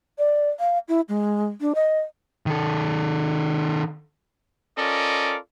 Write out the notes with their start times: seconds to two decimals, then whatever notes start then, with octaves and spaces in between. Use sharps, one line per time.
0.19 D5
0.59 F5
0.88 E4
1.09 G#3
1.61 D4
1.75 D#5
2.46 D#3 A4
4.78 C#4 F4 A4 A#4 D5 D#5